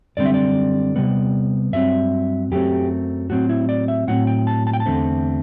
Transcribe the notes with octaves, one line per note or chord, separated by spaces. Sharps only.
F#2 D3 G3 C4 D5
E5
D5
C3 G3 B3
G2 F#3 C4 E5
F#2 F#3 A3 C4 G4
A2 F#3 C4 F#4
E4
D5
E5
A2 F#3 C4 F#5
G5
A5
A5
G5
A5
E2 D3 A3 C4